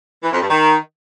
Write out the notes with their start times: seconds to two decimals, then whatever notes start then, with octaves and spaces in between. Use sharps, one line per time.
0.23 E3
0.32 F2
0.41 G2
0.50 D#3